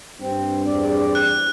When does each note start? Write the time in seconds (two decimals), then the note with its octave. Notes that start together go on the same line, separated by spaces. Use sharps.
0.21 G2 C4
0.66 E2 C4 D5
1.15 F#6